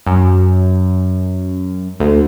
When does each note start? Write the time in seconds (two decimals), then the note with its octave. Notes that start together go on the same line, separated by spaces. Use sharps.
0.07 F#2
2.00 D2